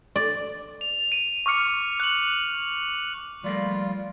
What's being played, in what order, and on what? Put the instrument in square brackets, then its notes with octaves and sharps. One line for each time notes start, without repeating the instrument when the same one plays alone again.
[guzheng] D5
[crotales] F7
D#7
C#6 D6 F6 C#7
F#6 F#7
[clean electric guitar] F3 A3 A#3 [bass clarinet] G3 [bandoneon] F4 [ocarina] D5